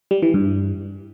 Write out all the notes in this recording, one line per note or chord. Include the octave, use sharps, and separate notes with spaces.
G3
E3
G2